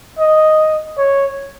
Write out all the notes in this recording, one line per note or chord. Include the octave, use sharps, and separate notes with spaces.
D#5
C#5